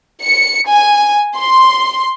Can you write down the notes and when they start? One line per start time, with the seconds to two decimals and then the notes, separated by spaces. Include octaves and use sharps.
0.22 C#7
0.68 G#5
1.37 C6